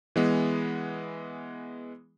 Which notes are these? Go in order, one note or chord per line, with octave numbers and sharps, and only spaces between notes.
E3 G#3 B3